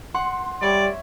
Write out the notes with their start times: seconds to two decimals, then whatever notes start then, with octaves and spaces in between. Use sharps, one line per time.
0.14 F#5 C6
0.62 G3 C#5 D5 E5 B5